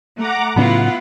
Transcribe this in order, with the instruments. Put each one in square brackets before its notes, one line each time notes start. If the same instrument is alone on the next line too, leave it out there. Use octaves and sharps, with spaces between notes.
[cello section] A3 [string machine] F#5 A#5 D6
[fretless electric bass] A2 C#3 F#3 [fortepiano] B3 [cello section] E4 F4 [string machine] F#5